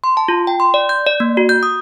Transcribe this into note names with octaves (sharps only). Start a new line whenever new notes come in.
C6
A5
F4
G5
C6
D5
G6
D5
A#3
F#4
G6
D#6